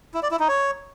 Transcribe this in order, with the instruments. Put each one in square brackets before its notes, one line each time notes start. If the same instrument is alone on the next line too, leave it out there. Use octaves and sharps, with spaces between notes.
[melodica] E4
D5
E4
D#4
C#5